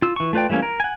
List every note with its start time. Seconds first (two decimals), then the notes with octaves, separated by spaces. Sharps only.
0.02 F4 E6
0.16 E3 C#6
0.33 A3 F4 B4 D5 G5
0.50 E3 G3 A3 A#3 C#4
0.62 A#4
0.80 F#5 G#5